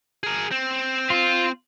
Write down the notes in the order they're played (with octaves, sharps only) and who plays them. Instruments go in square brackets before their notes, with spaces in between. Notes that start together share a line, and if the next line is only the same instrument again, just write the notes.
[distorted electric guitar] G#4 A#4
C4
[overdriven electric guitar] F4